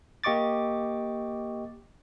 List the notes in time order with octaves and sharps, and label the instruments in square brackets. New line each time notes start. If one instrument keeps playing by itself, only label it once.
[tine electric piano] A#3 G4 D#5 C#6 D6 A6